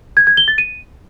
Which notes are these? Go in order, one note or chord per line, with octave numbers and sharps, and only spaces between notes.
G#6
G#6
G7
A6
D#7